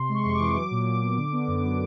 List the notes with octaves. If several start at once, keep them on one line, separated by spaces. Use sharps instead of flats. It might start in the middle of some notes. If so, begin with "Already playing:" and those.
Already playing: C3 C6
G#3
C#6
F2
E3 D6
F#3
A#2
A#2
B3
D3
B3
F#2
F#3